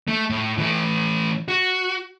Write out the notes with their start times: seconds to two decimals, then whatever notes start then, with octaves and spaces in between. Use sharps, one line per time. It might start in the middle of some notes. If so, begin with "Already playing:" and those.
0.08 A3
0.30 A2
0.58 E3 A3
1.48 F#4